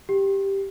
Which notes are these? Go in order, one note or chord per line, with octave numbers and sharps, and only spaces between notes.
G4